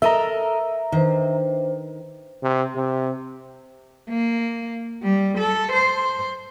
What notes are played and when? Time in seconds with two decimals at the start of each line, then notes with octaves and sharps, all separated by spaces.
0.02 A4 A#4 D#5 E5 A#5
0.92 D#3 D4 B4 C5
2.43 C3
2.76 C3
4.09 A#3
5.03 G3
5.38 A4
5.72 C5